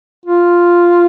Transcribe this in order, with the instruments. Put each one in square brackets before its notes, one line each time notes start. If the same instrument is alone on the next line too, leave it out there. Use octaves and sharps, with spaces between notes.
[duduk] F4